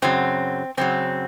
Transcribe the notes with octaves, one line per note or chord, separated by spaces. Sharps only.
F#2 C#3 F#3 C4
F#2 C#3 F#3 C4